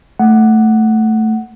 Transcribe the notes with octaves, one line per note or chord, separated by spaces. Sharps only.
A3 F#5